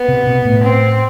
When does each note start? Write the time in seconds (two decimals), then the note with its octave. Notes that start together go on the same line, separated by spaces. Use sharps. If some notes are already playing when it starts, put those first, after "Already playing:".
Already playing: B3
0.08 C3
0.27 B2
0.45 A2
0.64 C4